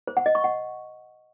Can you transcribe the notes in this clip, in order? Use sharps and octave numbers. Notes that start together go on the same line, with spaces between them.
C5
F#5
D#5
C#6
F#5